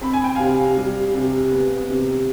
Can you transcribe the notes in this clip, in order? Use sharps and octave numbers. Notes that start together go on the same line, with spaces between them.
C4 B5
G#5
G5
C3 F5 G#5
G3
C3
B3
C3